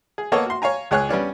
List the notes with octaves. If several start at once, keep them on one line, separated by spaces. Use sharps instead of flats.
G#4
A#3 B3 A4 C#5 D#5 F#5
F#4 C6
C#5 F5 G#5 A#5
C#2 G#4 C#5 G#5 F#6
G3 B3 C#4 D4